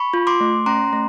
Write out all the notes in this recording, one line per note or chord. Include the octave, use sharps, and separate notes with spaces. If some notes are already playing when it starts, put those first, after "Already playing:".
Already playing: B5 C#6
F4
C6 D6
A3
C#4 A#5 C6
A3